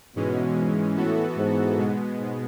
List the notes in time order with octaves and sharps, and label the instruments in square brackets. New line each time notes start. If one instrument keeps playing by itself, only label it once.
[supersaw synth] G#2 E3 G#3 C#4 [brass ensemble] B2
[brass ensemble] A2 [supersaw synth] E3 B3 F#4 A4
[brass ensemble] G#2
[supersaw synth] B2 G#3 B3
[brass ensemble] G#2